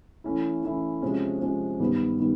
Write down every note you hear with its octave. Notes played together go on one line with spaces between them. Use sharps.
E3 A3 C#4 E4
E3 A3 C#4 E4
C3 F3 G#3 C#4
C3 F3 G#3 C#4
G2 D#3 G3 B3
D#3 G3 B3